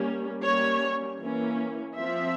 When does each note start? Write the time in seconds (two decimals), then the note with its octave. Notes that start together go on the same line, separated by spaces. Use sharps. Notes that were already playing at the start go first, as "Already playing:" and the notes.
Already playing: G3 A#3 C#4
0.44 G3 A#3 C#4 C#5
1.19 E3 A#3 C#4
1.95 F3 C4 E5